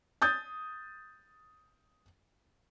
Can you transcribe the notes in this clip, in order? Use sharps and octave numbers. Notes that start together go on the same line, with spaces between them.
D#6 G6 A6